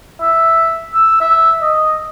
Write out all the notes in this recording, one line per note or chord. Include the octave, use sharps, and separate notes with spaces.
E5
E6
E5
D#5